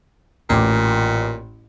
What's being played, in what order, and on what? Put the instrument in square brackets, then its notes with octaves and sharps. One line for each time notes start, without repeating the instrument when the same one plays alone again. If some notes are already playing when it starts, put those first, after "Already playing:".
[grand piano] A1 D6 [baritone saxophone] A#2